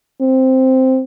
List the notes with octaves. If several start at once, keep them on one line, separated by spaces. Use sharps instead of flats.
C4